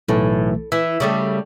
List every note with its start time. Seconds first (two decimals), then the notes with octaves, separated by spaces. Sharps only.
0.08 B1 A2 E3 A3
0.72 E3 E5
1.00 C#3 G3 A3